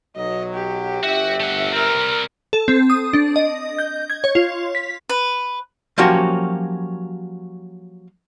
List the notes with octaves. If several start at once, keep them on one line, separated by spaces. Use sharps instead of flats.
B1 F#3 D#5
G4
G1 F#4 E5
A3 F#5
G3 C4 A#4
A4
C4
D#6
D4
D#5
G6
G#6
C#5
F4
B6
B4
F3 F#3 A#3 C#4 F#4 G4